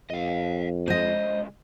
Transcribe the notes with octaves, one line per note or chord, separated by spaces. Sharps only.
F2 D#5 F5
C2 G#3 C5 D#5